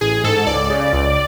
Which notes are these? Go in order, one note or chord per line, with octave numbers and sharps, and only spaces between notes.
A1 G#4
G#2 A4
C#2 D5
C#3
C#2